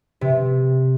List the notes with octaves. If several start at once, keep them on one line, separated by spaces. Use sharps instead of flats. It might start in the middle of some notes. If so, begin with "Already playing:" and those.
C3